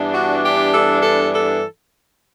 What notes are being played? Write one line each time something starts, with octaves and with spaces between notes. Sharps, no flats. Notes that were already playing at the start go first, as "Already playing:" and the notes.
Already playing: G2 E3 G3 B3 D4
F#4
G4
A4
A4
A4